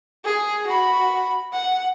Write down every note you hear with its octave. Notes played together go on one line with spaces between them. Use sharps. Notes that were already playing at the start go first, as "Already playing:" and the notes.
G#4
F#4 B5
F#5